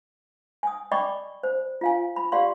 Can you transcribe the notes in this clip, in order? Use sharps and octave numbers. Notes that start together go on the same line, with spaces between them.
G#5 D#6
D5 D#5 G5 B5 C#6 D6
C5
F4 F5 G#5
B5
G4 D5 F5 C6